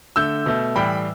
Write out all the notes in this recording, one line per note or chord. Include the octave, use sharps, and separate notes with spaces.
D3 A3 E6 G6
B2 A3
A2 E3 G3 G5 B5